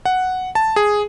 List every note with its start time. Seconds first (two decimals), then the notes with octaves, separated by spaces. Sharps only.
0.05 F#5
0.55 A5
0.76 G#4